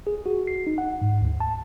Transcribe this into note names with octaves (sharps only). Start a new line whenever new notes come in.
G#4
F#4
C7
D#4
F#5
G#2
D2
A5